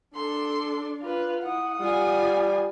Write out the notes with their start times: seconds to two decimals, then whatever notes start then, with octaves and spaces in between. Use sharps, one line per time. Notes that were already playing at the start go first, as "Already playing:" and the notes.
0.15 D4 A4 C6
1.02 F4 B4
1.43 E4 F#5 D#6
1.80 G3 F4 G#5